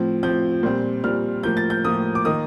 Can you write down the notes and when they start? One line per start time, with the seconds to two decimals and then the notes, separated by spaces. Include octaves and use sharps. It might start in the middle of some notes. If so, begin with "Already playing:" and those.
Already playing: A2 F3 C4
0.23 A2 F3 C4 G6
0.63 A#2 G3 C4
1.03 A#2 G3 C4 F6
1.43 A2 F3 A#3 G6
1.57 A6
1.70 G6
1.85 A2 F3 A#3 D#6
2.15 D6
2.25 D#3 A#3 D#6